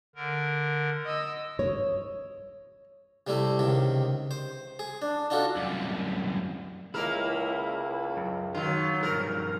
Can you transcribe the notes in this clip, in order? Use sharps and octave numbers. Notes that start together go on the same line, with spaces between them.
D3 A#4
D#5 E6
C#5
C3 G3 A3 E4
C#2 C3 D#3
C5
G#4
D4
D4 D#4 F4 F#4 A4
C2 F#2
C#2 A#3 E4 A#4
F#2
D#3 F#3 F4
G2 F3 A#4